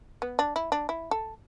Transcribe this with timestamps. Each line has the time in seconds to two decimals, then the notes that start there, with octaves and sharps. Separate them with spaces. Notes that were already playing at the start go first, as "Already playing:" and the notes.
0.22 B3
0.39 D4
0.56 E4
0.72 D4
0.89 E4
1.11 A4